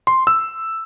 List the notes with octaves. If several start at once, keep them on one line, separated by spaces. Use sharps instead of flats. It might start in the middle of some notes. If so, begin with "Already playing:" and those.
C6
E6